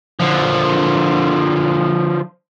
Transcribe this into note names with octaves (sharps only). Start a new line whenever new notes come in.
D3 F3